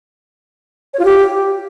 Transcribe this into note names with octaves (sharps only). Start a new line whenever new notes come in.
C#5
F4
G4